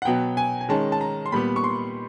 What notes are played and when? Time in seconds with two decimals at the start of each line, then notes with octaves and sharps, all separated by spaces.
0.02 F#5
0.05 B2 F#3 B3 G5
0.37 G#5
0.61 G#5
0.69 D#3 G#3 C#4 A5
0.92 A5
1.01 A#5
1.26 C6
1.32 A#2 G3 B3 B5
1.56 C#6
1.64 C6